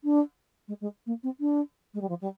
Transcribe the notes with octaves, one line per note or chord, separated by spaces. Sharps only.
D4
G#3
G#3
A#3
C4
D4
G#3
G3
F3
G3